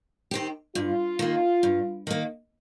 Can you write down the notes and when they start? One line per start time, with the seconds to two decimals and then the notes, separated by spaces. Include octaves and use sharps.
0.31 D#3 C4 G4
0.75 G2 F4
1.19 D#3 A#3
1.63 G2
2.07 D#3 A#3